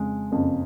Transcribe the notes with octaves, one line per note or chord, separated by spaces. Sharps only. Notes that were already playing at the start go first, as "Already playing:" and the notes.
Already playing: F2 C#3 G#3
F#1 F2 C#3